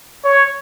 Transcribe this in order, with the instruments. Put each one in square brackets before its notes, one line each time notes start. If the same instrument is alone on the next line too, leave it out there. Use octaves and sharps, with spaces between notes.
[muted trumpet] C#5